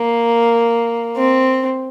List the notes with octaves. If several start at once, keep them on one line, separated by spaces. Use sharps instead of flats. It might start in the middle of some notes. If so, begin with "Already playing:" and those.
Already playing: A#3
C4